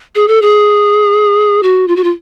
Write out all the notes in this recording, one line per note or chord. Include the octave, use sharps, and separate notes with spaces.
G#4
A4
G#4
F#4
F4
F#4
F4